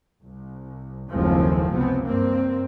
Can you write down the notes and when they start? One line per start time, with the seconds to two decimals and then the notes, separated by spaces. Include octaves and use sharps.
0.23 C2
1.10 F#1 D#2 A2 F3 G#3 C4
1.72 C#2 C3 B3 C4
2.03 G2 A#3 C4